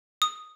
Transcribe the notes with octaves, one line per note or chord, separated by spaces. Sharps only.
D#6